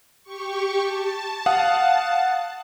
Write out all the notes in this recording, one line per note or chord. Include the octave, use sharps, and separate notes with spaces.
G4 C#6
A5
F5 F#5 D#6